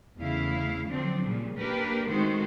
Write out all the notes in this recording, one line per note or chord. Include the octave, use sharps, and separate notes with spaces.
E2 C#3 A3 E4 F5
D3 F3 F#3 C4 D4
A#2 C#3 F3 G3
A#3 D4 G4 A#4 B4
D#3 G#3 A3 C4 F#4 C5